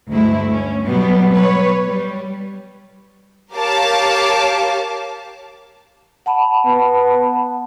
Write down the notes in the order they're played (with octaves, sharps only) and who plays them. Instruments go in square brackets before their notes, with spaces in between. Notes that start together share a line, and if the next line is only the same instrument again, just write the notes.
[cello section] D2 G2 G#3 A3 E4
C#4
B2 F#3 G3 B3
B4 C#5
G3
[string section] G4 A#4 C#5 F5 A5 D6
[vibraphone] F#5 A5 B5
[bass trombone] B3